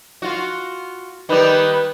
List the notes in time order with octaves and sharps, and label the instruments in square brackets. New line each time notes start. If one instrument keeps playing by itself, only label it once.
[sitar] F4 F#4
[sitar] D#3 G3 [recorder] B4